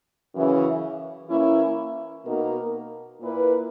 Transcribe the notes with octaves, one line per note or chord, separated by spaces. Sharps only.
F#2 C#3 E3
E3 A#3 C#4 E4
B2 A#3 D#4 A#4
A#2 A#3 E4 B4